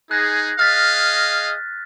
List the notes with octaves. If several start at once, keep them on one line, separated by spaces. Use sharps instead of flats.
D#4 G#4 F#6 A#6
G#4 D#5 F5 F6 A6 B6